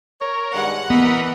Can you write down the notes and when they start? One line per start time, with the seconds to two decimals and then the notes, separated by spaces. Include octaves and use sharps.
0.21 A#4 C#5
0.54 G2 D#3 G#3 F#5
0.90 E3 B3 A#4 D#5 B5